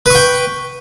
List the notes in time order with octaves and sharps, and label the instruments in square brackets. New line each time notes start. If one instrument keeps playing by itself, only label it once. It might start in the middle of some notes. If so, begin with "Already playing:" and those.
[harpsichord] B4
C#6
G5